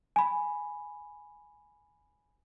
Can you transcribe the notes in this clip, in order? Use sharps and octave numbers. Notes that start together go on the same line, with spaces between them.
G#5 B5